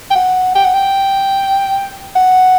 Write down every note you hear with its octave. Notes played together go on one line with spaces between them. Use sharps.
G5
F#5
G5
F#5
G5
F#5